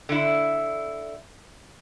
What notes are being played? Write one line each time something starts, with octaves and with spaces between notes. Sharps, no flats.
D3 E4